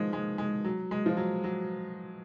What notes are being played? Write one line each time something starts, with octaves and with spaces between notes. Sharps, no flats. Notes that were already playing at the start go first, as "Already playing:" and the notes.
Already playing: D#3 F3 G#3
G#3
G#3
F#3
G#3
F3
F#3
F#3